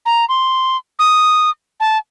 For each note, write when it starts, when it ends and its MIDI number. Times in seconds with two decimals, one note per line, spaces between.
0.06 0.25 82
0.29 0.77 84
0.99 1.50 87
1.80 1.98 81